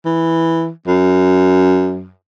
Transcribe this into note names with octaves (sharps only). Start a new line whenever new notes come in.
E3
F#2